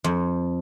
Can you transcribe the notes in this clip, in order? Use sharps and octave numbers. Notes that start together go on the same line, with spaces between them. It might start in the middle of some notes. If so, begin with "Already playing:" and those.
F2